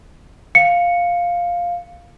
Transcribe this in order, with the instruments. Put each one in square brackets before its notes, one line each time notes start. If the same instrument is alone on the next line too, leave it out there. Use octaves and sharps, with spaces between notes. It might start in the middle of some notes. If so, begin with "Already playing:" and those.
[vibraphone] F5 [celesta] C#7